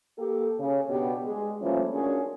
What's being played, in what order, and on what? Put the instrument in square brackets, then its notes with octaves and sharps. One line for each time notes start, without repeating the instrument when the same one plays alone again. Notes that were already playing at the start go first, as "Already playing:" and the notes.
[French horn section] A#3 G4 A4
C#3
B2 B3 D4 G4
G#3
E3 F3 G3 A3 A#3 C#4
C#4 D4 F4 F#4 G#4 A#4